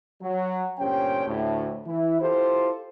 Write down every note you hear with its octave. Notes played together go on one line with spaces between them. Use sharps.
F#3
G1 A#2 C#4 G4 C5 G5
D2 A2
E3 E4
E4 F4 G4 A4 C5